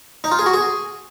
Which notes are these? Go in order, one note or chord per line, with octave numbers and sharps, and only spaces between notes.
D#4
F4
G#4
F#4
G#4